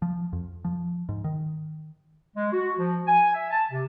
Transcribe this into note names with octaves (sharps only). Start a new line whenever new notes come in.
F3
F2
F3
G#2
D#3
G#3
F#4
F3
G#5
E5
A5
C3